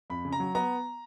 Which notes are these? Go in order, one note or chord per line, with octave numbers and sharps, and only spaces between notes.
F2 B5
C#3
A#5
F#3
B3 A#5